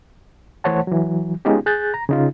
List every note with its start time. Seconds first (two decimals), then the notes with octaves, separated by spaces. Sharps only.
0.64 E3 A3 C5 C#5 F#5 A5
0.87 E3 F#3
1.45 G#3 B3 C#4 D#4 F4 G4
1.66 G#4 F#6 G6 A6
1.94 A#5
2.09 C#3 D#4 F4